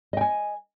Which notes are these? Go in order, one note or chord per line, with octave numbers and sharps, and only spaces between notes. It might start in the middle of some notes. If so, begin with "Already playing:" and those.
D#5 G5 G#5